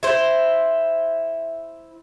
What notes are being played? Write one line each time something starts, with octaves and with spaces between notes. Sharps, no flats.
E4 C5